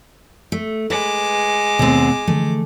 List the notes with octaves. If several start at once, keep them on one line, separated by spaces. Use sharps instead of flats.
A3
G#3 B4 D6
D#2 B2 A3 B3 C4
D3 E3 F3 A3